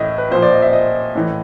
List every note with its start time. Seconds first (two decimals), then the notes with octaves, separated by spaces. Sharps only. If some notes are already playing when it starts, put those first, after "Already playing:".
Already playing: A2 E3 D#5 E5
0.18 B4
0.31 A#2 F3 C5
0.42 D5
0.52 D#5
0.62 E5
0.73 D#5
1.15 A2 E3